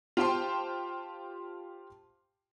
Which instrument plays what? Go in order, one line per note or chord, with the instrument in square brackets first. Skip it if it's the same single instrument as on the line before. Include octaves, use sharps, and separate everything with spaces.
[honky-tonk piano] F4 G4 C5 G5 A5 C6